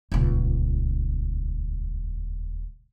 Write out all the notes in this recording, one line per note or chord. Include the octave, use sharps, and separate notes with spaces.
D#1 C#2